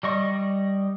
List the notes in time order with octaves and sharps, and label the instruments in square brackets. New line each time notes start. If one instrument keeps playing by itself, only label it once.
[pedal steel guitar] G3 D#5 C#6